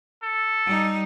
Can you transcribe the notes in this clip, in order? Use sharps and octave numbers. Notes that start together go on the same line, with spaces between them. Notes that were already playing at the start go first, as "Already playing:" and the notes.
A4
G3 D#4